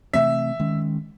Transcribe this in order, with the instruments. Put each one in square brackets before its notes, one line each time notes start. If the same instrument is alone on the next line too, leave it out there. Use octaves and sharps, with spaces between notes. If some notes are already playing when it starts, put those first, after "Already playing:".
[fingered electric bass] C3 E3 A3 C4 [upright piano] E5
[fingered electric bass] D#3 G#3 C#4